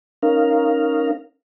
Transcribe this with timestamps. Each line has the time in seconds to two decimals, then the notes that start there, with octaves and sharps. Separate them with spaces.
0.23 C#4 D#4 A#4 F5